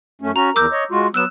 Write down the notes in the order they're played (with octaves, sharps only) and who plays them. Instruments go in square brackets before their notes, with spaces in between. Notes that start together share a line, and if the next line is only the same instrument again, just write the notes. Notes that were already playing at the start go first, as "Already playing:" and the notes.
[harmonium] F#2 A3 C#4
[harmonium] C#4 F#4 [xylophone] A#5
[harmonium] E2 A#4 [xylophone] D6 E6 G6
[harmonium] C#5 D#5
G#3 F4 F#4
[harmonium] F#3 B3 [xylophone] E6 F#6 E7